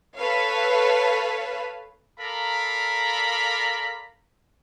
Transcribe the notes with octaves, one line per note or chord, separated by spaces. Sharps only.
A4 B4 C#5 F5
A4 A#4 D5 F5 A#5 B5